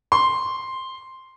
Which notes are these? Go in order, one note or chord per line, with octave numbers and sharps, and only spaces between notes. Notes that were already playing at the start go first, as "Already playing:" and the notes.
C6